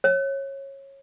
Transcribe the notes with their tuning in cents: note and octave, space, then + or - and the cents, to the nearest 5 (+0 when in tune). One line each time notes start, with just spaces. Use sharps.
C#5 -20